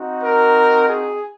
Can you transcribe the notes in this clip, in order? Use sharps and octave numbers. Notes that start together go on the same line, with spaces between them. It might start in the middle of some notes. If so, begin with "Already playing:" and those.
Already playing: C4 D#4 F#4
A#4
G#4